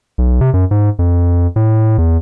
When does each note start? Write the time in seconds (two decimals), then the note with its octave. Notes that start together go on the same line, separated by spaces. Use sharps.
0.18 B1
0.41 C3
0.54 F#2
0.71 G#2
0.99 F2
1.56 A2
1.98 E2